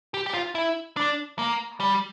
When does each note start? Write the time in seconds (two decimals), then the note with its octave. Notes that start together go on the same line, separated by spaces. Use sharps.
0.14 G4
0.26 G4
0.34 F4
0.55 E4
0.97 D4
1.39 A#3
1.80 G3